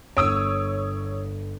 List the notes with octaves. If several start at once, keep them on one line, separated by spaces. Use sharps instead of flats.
G1 C#5 D#6 E6 D7